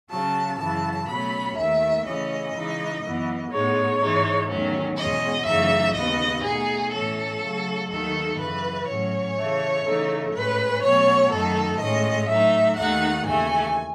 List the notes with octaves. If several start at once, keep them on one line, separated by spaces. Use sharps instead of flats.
C#3 F#3 C#4 A5
F#2 C#3 E3 A5
B2 F#3 A3 C#4 B5
D#2 D#3 A3 E5
C#3 E3 A3 C#4 D#5
C#3 E3 G#3 D#4
F#2 E3 B3
A2 G#3 B3 D#4 C#5
G#2 E3 G#3 D#4
E2 D#3 F#3 A3 C#4
E2 B2 G#3 C#4 D#5
F#2 C#3 E3 A3 D#4 E5
D#2 C#3 G#3 B3 D#5
B2 A3 D#4 G#4
A2 E3 A3 C#4 A4
C#3 F#3 A3
D#2 D#3 F#3 A3 D#4 A4
F#2 C#3 E3 B4
A2 F#3 C#4 C#5
C#3 E3 A3
C#3 E3 A3 D#4
A2 G#3 C#4 B4
B2 F#3 A3 C#4 C#5
F#2 D#3 A3 D#4 A4
A2 G#3 C#4 D#5
A2 F#3 A3 D#4 E5
D#2 D#3 A3 D#4 F#5
D#2 C#3 E3 A3 G#5